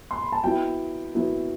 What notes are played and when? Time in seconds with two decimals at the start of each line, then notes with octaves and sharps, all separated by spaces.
0.11 C6
0.21 B5
0.32 A5
0.43 F#3 B3 E4 G5
1.15 F#3 B3 E4